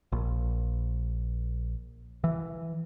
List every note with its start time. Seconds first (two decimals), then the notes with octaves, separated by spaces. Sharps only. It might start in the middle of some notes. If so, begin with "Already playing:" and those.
0.12 A#1
2.24 E3